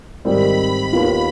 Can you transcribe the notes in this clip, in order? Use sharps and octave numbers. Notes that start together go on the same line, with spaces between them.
G#2 D#3 G3 C4 B5
D#2 D#3 B3 F4